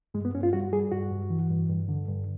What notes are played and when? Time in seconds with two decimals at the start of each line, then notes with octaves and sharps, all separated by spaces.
0.14 G2 G#3
0.25 B3
0.34 G2 C#4
0.43 F4
0.53 G3 F#4
0.73 G3 G#4
0.91 G2 F#4
1.11 G2
1.30 E3
1.50 G2
1.69 G2
1.89 D3
2.08 G2